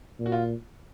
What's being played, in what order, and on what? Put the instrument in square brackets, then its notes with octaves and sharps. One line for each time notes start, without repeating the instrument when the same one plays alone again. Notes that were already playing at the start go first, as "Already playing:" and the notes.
[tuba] A#2
[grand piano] F#4
F4